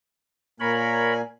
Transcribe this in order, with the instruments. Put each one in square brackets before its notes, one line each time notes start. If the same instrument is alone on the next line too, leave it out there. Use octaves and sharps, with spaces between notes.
[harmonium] A#2 A#3 G#5 [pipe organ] A#4 C#5 B5